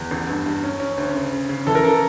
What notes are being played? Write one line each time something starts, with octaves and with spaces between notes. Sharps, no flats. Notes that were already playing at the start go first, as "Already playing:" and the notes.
Already playing: E2
A1
G2
G2
C#4
C#4
D2
C#3
C#3
C#3
E3 A4
A#4
C#3 A4